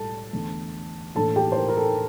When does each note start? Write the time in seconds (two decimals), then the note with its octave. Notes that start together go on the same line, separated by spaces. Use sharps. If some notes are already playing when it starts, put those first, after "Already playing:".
Already playing: A2 G3 A4 A5
0.33 E2 D3 A3
1.15 A2 E3 A#3 D4 A4 A5
1.36 G4 G5
1.52 C5
1.57 A#4
1.69 A#4
1.77 A4